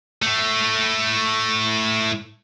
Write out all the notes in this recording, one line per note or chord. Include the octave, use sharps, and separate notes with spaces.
A2 A3